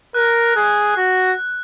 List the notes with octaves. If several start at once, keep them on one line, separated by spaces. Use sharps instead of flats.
A#4 F#6
G#4
F#4